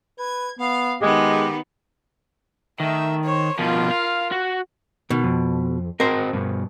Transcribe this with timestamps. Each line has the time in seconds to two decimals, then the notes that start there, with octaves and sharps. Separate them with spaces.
0.19 B4 G#6
0.59 B3 F5
1.01 D#3 G#3 B3 G4
2.80 D#3 A3 E5
3.24 C5 C#5
3.59 B2 F3 F4 A#4
3.91 F5
4.32 F#4
5.10 B2 D#3
5.24 F2
6.00 C4 F#4 A#4 C5 D#5
6.33 G2 B2